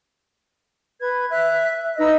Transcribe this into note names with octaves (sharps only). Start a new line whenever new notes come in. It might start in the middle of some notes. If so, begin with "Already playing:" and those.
B4 G#6
E5 F#6
D#4 B4 D#5 E6